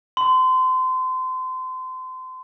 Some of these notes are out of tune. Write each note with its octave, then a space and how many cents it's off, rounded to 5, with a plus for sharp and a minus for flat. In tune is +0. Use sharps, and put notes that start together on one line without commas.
C6 -30